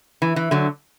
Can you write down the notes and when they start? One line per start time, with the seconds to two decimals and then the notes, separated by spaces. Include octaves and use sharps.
0.22 E3
0.36 E3
0.51 D3 F#3